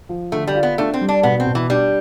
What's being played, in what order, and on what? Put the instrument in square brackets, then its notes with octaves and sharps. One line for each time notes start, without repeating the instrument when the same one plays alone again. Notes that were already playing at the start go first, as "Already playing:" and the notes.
[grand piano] F3
[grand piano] D3 [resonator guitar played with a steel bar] A3
[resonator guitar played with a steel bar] G3
[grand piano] F4
[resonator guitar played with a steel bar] B3
[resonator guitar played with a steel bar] A3 [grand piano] D4
[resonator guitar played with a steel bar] C4
[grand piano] G3
[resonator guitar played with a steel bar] D4
[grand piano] B2 [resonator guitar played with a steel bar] B3
[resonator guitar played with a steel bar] C4
[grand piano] B2
[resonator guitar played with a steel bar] E3
[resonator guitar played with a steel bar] G3 [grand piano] D4